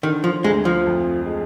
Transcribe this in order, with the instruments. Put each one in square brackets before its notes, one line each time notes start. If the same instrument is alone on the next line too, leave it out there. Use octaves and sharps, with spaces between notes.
[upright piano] D3 [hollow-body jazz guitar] D#3
[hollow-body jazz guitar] F3
[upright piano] D2 [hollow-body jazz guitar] G#3
[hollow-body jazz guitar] F3
[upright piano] F2
G#3